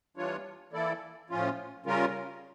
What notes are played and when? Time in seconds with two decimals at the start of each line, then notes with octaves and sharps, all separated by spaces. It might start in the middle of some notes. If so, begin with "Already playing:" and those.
0.17 E3 G3 D4 F4 C#5
0.73 E3 A#3 E4 A4 D5
1.30 A2 F3 C#4 F4
1.86 C#3 G3 C#4 F4 A#4